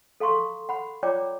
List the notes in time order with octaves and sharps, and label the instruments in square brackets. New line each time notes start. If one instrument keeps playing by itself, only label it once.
[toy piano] A4 F5 A#5 C6 C#6
F#5 B5
F4 C#5 D5 G5 A#5 D6